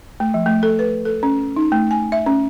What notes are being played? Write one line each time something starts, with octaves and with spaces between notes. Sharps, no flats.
A3
F3
A3
A4
B4
A4
C#4
D#4
A3
G#5
E5
C#4